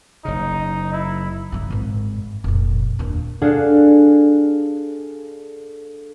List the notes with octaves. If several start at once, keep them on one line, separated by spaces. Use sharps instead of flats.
F#1 C#3 D#4
E4
G2 C#3
G#1 G#2
F1 A#2
D#2 D4
D4 F#4 G#4 A4 F5 F#5